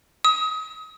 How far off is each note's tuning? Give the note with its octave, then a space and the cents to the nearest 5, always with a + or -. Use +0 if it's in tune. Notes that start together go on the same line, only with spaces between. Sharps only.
D#6 +30